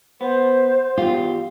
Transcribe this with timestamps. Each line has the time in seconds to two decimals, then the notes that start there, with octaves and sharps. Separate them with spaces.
0.21 B3 C5
0.97 E2 F4 G4